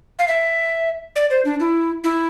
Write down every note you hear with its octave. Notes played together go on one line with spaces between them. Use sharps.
F5
E5
D5
C5
D4
E4
E4